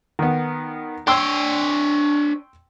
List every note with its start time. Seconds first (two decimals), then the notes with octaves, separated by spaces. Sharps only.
0.19 D#3 B3
1.07 D4 C#5 G5 C6 E6